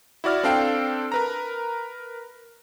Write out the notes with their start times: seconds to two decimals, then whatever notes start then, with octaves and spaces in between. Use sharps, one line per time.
0.24 E4 F#4 D5 F6
0.43 C4 D4 A4 F5 G5
1.12 A#4 B4 A#5